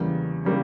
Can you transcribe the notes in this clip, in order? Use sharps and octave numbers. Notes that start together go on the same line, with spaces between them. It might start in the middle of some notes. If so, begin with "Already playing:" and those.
Already playing: E2 C#3 G3 A#3
C#3 G3 A#3